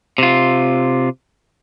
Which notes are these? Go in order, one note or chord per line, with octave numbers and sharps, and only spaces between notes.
C3 F4